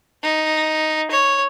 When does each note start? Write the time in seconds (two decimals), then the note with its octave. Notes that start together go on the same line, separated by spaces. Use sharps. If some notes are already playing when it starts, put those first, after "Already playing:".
0.23 D#4
1.11 C#5